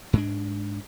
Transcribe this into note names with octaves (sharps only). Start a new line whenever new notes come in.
G#2 G#3 D4